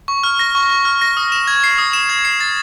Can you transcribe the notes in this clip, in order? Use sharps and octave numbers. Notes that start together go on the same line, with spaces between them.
C#6
F6
A#6
C#6
C#6
F6
A#6
D#6
E7
G#6
C7
D#6
E7
G#6
C7
A6